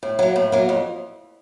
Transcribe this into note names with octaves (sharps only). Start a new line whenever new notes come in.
A2
F#3 A#3
A2
F#3 A#3
F2